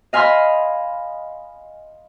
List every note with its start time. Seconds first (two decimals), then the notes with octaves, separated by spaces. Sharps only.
0.13 D#5 F5 G#5 B5 C6 F6